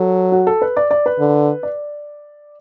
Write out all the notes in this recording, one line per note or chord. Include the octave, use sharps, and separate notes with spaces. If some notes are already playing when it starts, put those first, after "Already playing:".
Already playing: F#3 A4
F#4
A4
B4
D5
D5
B4
D3
D5